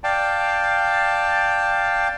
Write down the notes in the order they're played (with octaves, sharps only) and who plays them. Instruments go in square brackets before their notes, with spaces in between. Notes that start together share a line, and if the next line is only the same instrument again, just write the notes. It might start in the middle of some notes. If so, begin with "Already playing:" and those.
[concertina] D5 F5 G5 A5